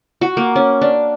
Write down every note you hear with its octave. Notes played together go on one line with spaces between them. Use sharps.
F#4
A#3
C#4
D4